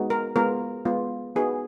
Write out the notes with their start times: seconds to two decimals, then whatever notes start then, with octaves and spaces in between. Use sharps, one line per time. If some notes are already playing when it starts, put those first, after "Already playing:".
Already playing: G#3 B3 D#4 F#4
0.10 A#4
0.36 G#3 B3 F4 A#4
0.85 G#3 B3 F4
1.36 B3 D#4 F#4 G#4 B4